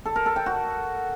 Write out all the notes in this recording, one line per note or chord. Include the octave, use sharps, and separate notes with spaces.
A4
A#4
A4
G5
F#4